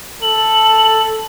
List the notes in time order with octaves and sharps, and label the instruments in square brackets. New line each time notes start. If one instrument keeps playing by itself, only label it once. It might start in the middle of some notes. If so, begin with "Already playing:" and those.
[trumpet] A4 [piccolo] F#7